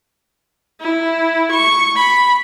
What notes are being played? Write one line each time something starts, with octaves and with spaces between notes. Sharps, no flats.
E4
C#6
B5